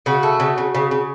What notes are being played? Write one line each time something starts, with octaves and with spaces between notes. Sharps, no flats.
C#3 F#4
A3
C#3
C#3
C#3
C#3